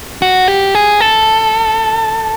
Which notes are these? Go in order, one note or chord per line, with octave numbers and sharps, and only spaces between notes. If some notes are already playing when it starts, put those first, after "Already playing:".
F#4
G4
G#4
A4